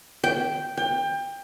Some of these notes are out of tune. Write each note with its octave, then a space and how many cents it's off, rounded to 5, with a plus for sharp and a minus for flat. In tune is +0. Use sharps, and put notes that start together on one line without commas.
G5 -5
G5 +25